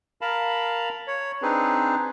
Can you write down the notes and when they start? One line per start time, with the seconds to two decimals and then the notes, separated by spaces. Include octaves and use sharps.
0.21 A#4 F5 A5 B5
1.07 C#5
1.42 C4 D4 D#4 G#4 B4